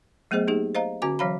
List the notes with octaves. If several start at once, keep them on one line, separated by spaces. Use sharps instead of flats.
F#3 A3 B3 G#4 C5 D#5
A#3 D#4 G4 G#4
C5 D#5 F5 A#5
D3 C#4 F#4 G#5 D6
E3 F#3 C#5 F5 A#5 B5